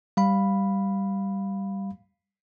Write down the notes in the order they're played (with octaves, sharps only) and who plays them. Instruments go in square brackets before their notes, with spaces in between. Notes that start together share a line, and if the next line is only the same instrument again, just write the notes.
[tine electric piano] G3 F5 B5